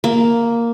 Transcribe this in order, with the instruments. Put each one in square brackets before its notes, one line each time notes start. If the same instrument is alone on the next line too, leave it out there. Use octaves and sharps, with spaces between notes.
[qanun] A#3